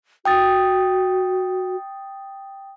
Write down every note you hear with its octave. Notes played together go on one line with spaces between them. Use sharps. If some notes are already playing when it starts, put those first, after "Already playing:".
F#4 G5 D#6 A6